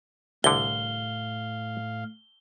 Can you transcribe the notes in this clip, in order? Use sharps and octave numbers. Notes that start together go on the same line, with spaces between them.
C2 A2 D3 F5 G7